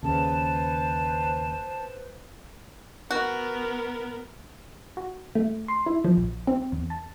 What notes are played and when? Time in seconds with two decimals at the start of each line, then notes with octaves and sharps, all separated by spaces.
0.03 D#2 C#3 B4 C5 A5
3.11 B3 F#4 A#4
4.97 F#4
5.35 A3
5.68 C6
5.86 E4
6.05 F3
6.17 A#1
6.47 C4
6.72 E2
6.90 A5